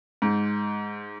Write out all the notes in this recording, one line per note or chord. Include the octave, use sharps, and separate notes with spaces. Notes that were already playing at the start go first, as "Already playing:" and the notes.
G#2